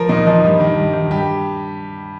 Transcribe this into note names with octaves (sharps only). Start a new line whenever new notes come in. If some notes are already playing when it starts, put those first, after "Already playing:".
Already playing: F3 A#4
A#2 D#4
F3 D#4
G2
D#3
G2
D#3
G2 G4